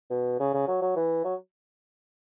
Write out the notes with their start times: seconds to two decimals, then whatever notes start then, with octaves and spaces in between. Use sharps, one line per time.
0.10 B2
0.40 C#3
0.54 C#3
0.67 F#3
0.81 F#3
0.96 E3
1.24 F#3